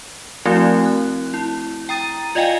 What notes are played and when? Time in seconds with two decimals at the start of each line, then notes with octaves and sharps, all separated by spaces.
0.45 F3 A3 C4 E4 F#4
0.86 F#6
1.34 E4
1.89 G5 A#5 D#6 A6 D#7
2.35 F4 D5 D#5 F5 G5 G#5